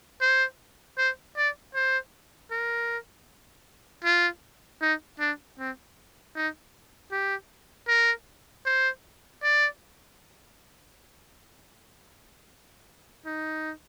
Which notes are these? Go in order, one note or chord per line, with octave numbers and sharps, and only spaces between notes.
C5
C5
D5
C5
A#4
F4
D#4
D4
C4
D#4
G4
A#4
C5
D5
D#4